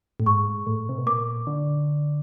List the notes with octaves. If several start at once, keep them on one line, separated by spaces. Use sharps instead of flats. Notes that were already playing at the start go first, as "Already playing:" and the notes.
A2
G#2 C#6
A2
C3
B2
A#2 D6
D3